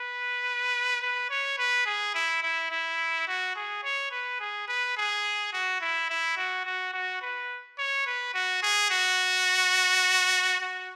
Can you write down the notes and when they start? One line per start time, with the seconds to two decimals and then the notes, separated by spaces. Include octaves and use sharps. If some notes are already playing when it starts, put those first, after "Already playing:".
Already playing: B4
1.02 B4
1.30 C#5
1.58 B4
1.86 G#4
2.15 E4
2.43 E4
2.71 E4
3.28 F#4
3.56 G#4
3.84 C#5
4.12 B4
4.40 G#4
4.68 B4
4.97 G#4
5.53 F#4
5.81 E4
6.10 E4
6.37 F#4
6.65 F#4
6.93 F#4
7.22 B4
7.78 C#5
8.06 B4
8.34 F#4
8.63 G#4
8.91 F#4
10.60 F#4